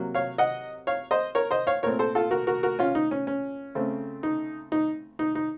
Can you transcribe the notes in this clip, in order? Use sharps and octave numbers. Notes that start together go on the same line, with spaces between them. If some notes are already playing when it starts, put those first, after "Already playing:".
Already playing: C3 F#3 A#3
C#5 F5
D#5 F#5
C#5 F5
C5 D#5
A#4 C#5
C5 D#5
C#5 F5
A#2 A3 C4 A#4 C#5
A4 C5
F4 A4
F#4 A#4
F#4 A#4
F#4 A#4
C#4 F4
D#4
C#4
C#4
C#3 A3 C4
D#4
D#4
D#4
D#4